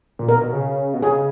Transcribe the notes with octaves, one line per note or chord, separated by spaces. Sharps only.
A#2
B2 A#4
B2
C#3
B2
C#3 G#4